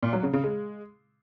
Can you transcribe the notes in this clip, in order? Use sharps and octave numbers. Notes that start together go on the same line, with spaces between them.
A#2
F#3
C#3
C#3
G#3